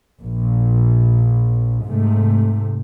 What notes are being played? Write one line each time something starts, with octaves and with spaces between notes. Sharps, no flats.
A#1
G#2 C3 A3